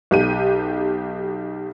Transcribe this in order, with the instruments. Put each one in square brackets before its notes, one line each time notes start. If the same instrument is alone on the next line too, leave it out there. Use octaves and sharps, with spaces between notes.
[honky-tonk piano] B1 G4 D#7